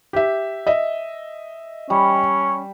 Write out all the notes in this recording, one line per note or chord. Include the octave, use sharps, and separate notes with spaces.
G4 E5
D#5 E5
G3 C#4